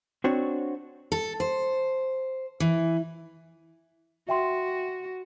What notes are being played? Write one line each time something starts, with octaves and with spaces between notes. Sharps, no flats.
C4 D4 F#4 C#5
A4
C5
E3
F#4 E5 G5 C6